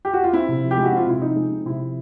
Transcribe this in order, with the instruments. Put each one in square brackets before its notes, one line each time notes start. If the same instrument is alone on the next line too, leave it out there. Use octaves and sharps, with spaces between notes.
[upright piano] G4
F#4
F4
C4 E4
C3
F3
G4
G#3
F#4
C4 F4
C3 E4
F3 D#4
G#3
C4
C3 E4
F3